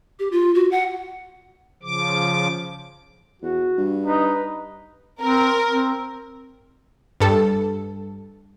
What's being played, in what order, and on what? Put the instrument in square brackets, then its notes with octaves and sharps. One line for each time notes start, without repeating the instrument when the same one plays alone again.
[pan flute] G4
F4
F#4
F#5
[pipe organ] C#3 F3 D6
[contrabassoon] E2 [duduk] F#4
[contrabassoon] G2
[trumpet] D#4 [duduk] B4
[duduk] C4 [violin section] A#4
[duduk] C4
[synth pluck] G2 A4